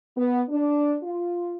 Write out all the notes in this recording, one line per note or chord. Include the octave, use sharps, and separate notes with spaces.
B3
D4
F4